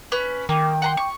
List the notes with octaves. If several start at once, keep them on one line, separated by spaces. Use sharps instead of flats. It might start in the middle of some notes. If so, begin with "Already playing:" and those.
C#4 B4
D#3 A#3 G5
F#5 A#5 C6
C#6